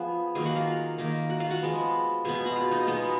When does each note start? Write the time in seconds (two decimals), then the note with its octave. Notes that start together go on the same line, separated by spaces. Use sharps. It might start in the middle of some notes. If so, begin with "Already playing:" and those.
Already playing: F3 B3 G#4 G#5
0.35 D#3 F#3 A#3 G#4 G#5
0.46 F#4 F#5
0.56 F4 F5
0.98 D#3 A#3
1.30 F#4 F#5
1.40 F4 F5
1.50 F#4 F#5
1.62 F3 G#3 B3
2.25 B2 G#3 B3 G#4 G#5
2.35 G#4 G#5
2.46 F#4 F#5
2.56 F4 F5
2.71 D#4 D#5
2.87 B2 G#3 B3 D#4 D#5